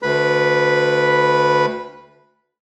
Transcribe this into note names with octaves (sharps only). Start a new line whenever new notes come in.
D2 B4 B5